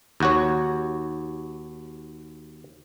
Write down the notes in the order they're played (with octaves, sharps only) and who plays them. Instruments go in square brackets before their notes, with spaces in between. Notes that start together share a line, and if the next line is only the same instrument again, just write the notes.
[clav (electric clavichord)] D#2 F#4 C#5